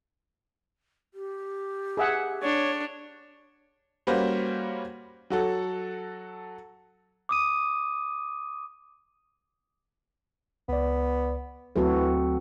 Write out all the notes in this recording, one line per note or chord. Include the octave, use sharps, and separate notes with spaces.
G4
G#4 E5 F#5
D4 C#5
G3 A#3 C#4 F#4 B4 C5
F#3 F#4 A4
D6 D#6 D#7
C#2 B3 D5
D2 E3 F#3 A3 C4 F#4 A4